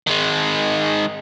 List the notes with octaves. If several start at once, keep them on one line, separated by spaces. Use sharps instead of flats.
D#3 G#3